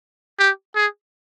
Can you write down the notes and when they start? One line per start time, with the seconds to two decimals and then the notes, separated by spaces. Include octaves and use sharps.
0.39 G4
0.75 G#4